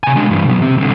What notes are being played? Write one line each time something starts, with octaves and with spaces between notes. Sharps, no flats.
C3 G#5
G#3 D4
G2 E3
B2 F#3
C3 C4
C2 D3